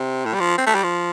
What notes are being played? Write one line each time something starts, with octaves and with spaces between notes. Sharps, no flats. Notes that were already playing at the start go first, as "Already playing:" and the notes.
Already playing: C3
A2
G3
F3
C4
A3
G3
F3